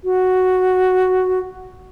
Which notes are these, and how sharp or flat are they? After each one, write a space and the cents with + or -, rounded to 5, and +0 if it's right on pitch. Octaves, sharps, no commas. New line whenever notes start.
F#4 +0